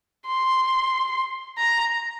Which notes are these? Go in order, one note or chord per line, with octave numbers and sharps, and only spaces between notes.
C6
A#5